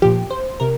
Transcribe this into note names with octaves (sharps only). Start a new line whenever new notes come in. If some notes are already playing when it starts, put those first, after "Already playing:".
A#2 F3 G4
C5
C3 A#4